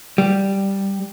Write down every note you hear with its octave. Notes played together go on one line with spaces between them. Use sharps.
G3